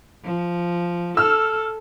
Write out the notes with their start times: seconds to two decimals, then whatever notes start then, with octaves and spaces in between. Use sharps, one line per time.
0.24 F3
1.17 A4 E6 F6